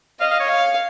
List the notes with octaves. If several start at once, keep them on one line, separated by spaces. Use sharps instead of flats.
D#5 F5
F5
C#5
F5